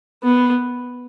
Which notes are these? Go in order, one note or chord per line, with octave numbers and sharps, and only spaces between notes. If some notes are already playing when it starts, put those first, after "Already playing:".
B3